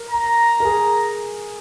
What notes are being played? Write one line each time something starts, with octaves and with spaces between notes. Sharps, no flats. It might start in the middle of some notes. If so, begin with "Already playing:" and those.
Already playing: A#4
A#5
A#4
G#4